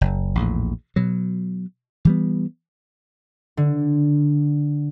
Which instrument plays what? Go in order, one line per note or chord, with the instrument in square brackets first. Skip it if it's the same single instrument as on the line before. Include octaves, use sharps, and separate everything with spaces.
[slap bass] F#1
A#1 E2 A2
B2 F#3
E3 G3 B3
[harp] D3